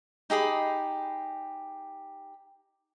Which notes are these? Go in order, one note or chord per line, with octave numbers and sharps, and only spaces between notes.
D#4 G4 G#4 B5